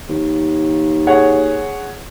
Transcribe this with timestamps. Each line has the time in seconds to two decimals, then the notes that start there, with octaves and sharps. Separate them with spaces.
0.09 D#2
1.07 G#4 C#5 F#5